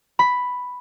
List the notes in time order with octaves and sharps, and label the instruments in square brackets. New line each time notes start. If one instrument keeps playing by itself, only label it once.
[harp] B5